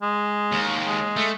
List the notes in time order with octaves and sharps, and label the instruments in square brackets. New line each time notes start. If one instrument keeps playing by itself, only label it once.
[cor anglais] G#3
[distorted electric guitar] D#2
[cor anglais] G#3
[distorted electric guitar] A3